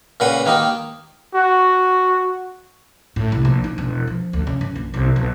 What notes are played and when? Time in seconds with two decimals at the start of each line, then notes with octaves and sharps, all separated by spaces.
0.20 A#2 C#3 B4 F#5
0.46 D#3 A#3 D#4 G4
1.34 F#4
3.16 A2
3.32 C2
3.45 A#1
3.64 D#4
3.78 E1
4.07 F3
4.33 D2
4.47 C#3
4.61 F#2
4.76 A#1
4.94 C2
5.16 B1